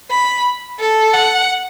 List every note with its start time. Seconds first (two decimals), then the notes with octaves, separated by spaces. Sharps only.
0.10 B5
0.80 A4
1.14 F#5